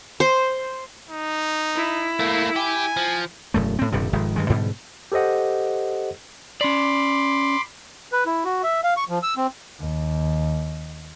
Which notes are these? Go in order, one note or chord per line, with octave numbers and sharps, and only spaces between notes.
C5
D#4
E4
A3 A#3
G4 G#5
F3
E1 F#2 A3
A2 C4
D#1 G2 C3 G3
F1 G#2 D#3
G2 D#3 G#3
G#2 B2 D3 G3
G4 A4 C5 D#5 F#5
C#4 D5 B5 C6 D6
B4
E4
F#4
E5
F5
C#6
F3
E6
C4
D#2